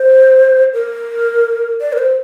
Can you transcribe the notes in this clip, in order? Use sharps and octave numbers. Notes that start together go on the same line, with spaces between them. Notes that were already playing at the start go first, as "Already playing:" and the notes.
Already playing: C5
A#4
D5
A#4
C5